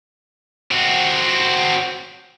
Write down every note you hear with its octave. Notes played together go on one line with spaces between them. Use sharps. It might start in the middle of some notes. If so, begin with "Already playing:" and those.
C4 F#4